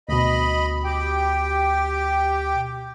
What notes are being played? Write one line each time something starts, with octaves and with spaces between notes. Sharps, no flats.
D2 B2 D#5 B5
G4 G5